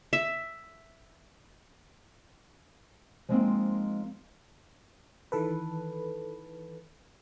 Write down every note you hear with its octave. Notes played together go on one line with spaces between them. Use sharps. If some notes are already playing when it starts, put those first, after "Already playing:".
E5
F3 G3 G#3 A#3 C4 D#4
D#3 E3 A4 B4